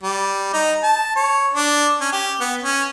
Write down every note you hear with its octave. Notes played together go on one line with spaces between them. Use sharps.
G3
D#4
A5
C#5
D4
C#4
G4
B3
C#4